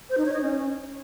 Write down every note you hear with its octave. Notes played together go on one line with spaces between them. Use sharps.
C5
D#4
C#5
D#5
C#4